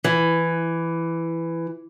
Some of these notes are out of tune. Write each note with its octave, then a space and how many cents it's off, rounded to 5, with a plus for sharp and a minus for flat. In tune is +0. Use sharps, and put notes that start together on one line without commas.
E3 +10